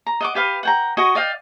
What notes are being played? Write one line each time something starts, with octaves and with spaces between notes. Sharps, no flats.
A#5
D#5 F#5 D6
G4 B4 F5
F#5 G5 A#5
F#4 D#5 G#5 C#6
D5 D#5 F5 G5